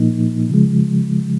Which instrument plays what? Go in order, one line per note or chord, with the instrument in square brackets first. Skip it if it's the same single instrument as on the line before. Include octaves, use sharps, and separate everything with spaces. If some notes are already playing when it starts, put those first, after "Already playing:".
Already playing: [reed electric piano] A#2 F3 A#3 D#4
C#3 F3 G#3